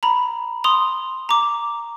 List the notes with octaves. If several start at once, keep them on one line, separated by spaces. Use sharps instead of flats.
A#5 B5
C6 D#6 F7
A#5 D6